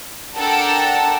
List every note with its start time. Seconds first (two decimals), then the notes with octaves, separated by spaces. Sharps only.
0.37 D4 A4 A#4 F#5 G5 A5